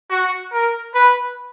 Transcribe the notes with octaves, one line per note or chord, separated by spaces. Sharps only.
F#4
A#4
B4